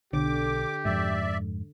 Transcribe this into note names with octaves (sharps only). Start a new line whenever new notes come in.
B1 D3 G4 D6
F2 G#2 D5 E5